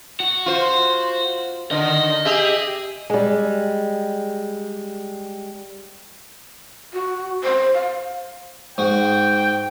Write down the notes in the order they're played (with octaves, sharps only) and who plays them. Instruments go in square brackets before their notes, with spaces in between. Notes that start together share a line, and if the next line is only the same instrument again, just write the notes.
[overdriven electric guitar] F#4
[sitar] F4 C5
[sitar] D3 D#3 [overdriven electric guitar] D#5
[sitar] G4 G#4 E5
[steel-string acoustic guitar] G3 G#3
[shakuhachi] F#4
C5
F5
[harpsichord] G#2 F#4 [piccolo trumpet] G5